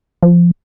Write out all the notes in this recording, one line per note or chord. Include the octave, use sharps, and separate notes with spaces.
F3